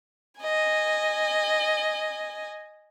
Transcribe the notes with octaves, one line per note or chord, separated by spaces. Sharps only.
D#5 G#5